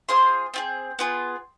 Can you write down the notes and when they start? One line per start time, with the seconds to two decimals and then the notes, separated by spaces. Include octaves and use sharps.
0.09 C4 F4 G#4 C6 D#6
0.54 C4 F4 G#4
0.99 B3 F4 G#4